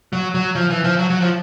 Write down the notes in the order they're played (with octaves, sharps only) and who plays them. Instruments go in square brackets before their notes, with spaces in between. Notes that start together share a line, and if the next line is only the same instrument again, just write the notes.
[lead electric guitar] F#3
F#3
F3
E3
F3
F#3
F#3
F3